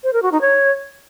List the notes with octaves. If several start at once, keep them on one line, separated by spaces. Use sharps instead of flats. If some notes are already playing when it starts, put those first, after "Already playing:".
C5
A#4
F#4
D#4
C#5